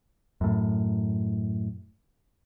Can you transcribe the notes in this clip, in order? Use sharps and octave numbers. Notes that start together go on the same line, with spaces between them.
F#2 A2